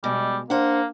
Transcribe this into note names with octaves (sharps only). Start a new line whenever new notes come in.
B2 G3 G#3
A#3 D4 C5 F#5